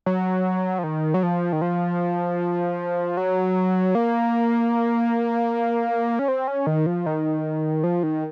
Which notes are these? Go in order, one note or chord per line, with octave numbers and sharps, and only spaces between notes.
F#3
F3
D#3
F#3
F3
D#3
F3
F#3
A#3
C#4
C4
C#4
D#3
F3
D#3
F3
D#3